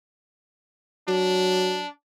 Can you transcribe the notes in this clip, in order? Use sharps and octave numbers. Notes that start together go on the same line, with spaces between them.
F#3 D4